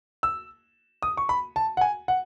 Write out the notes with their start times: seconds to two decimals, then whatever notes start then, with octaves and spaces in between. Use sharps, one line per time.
0.23 E6
1.02 D#6
1.17 C#6
1.29 B5
1.56 A5
1.77 F#5
1.81 G#5
2.08 F#5